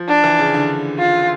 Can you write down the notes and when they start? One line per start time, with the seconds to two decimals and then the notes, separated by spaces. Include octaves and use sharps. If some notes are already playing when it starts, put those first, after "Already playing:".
Already playing: F3
0.09 D4
0.24 E3
0.39 C#3
0.54 D3
0.99 F4